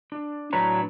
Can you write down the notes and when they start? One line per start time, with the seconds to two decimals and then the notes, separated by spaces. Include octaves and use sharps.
0.12 D4
0.53 A2 F#3 D4 B4 C#5 A#5